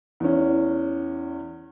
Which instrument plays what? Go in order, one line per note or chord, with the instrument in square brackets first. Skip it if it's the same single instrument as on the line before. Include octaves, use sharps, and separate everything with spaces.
[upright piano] E2 C#4